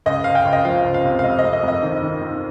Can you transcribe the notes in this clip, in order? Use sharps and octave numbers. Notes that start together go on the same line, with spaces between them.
C#2 D#5
C#2 F5
G5
C#2
D#5
F3 F5
C#2
F5
C3
F5
F2 D#5
D#5
F2
D#5
F2
D#5
D#3
D#3
D#3